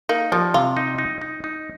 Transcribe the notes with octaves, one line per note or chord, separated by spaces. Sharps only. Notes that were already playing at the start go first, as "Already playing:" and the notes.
A#3 D#4
F3 G3
C3 F4
D#4
D#4
D#4
D#4